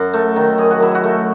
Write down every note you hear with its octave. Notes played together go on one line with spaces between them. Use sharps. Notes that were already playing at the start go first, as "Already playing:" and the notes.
Already playing: F#2 F#4
A3
D#3
F#2 G#4
F#4
F#2 E4
F#4
A3